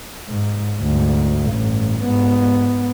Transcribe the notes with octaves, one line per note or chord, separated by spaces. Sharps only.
G#2
D2 G#2
A1 G2
G#2 B3